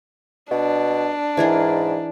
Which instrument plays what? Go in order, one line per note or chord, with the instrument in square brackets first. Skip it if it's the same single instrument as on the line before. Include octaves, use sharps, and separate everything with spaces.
[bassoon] B2 [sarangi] D4
[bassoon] G#2 [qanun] E3 G#4 A#4